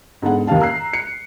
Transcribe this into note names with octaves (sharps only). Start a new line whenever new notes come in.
G#2 D3 G#3 B3 F#5
D#2 D#3 G4 F5 A5
A#5 E6 F#6 C7
C#7